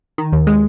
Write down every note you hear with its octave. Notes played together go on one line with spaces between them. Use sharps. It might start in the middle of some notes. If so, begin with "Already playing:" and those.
D#3
D#2
G#3